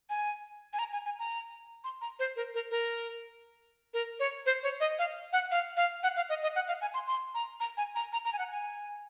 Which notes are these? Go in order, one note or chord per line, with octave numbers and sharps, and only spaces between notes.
G#5
G#5
A#5
G#5
G#5
A#5
C6
A#5
C5
A#4
A#4
A#4
A#4
C#5
C5
C#5
D#5
F5
F#5
F5
F5
F#5
F5
D#5
D#5
F#5
F5
G#5
C6
C6
A#5
A#5
G#5
A#5
A#5
A#5
G#5
F#5
G#5